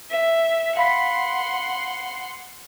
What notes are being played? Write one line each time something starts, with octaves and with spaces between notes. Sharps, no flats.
E5
F5 F#5 B5 C6 B6